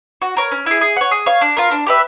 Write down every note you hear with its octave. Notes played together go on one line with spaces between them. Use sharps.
F#4
A#4 C#5
C#4
E4 G#4
G#4
C#5 F#5
G#4
C#5 F5
D4
F4 A#4
D4
G4 B4 E5